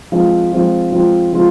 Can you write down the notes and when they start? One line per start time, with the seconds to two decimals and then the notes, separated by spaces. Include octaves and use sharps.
0.12 F3 G#3 C4 F4
0.52 F3 G#3 C4 F4
0.92 F3 G#3 C4 F4
1.33 F3 G#3 C4 F4